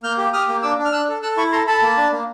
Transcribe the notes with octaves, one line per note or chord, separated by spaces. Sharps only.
A#3 F6 G6
G4
G4 D#6 F6
A#3
D4 D6 E6
D4
F6
D4 E6 F#6
A4
A4 E6 F#6
E4 B5 C#6
A4 A#5 C6
A4 A5 B5
A#3
D4
A#3